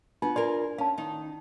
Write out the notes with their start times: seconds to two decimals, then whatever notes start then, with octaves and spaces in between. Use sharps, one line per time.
0.22 B3 D4 F4
0.36 F4 G#4 A#4 D5 C6
0.78 C#4 F5 A5
0.98 D#3 D#4